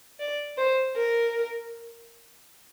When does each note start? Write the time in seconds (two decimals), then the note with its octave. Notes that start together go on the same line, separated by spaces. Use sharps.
0.19 D5
0.58 C5
0.96 A#4